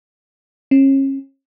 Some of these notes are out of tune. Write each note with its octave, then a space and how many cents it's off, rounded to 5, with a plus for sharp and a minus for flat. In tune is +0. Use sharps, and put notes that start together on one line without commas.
C#4 -35